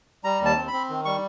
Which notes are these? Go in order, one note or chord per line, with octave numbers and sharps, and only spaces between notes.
G3 A#5
D#2 A5
C4
B5
C4
D#3
G3 C#6